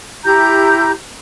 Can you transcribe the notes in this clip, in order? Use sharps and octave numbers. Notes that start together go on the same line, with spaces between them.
E4 G4 A#5 G6